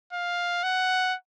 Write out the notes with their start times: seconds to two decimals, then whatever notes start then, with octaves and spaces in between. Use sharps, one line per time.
0.13 F5
0.63 F#5